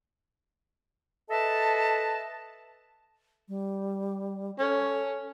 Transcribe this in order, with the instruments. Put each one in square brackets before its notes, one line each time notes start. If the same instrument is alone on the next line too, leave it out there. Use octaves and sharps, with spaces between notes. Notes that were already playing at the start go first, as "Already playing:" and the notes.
[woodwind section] A4 B4 D#5 E5 A5
[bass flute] G3
[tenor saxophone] C#4 [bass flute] A4